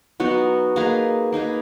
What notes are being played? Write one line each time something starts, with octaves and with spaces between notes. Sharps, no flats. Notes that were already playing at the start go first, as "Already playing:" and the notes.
F#3 B3 D#4 F#4
A#3 D#4 G#4 B4
A#3 D#4 G#4 B4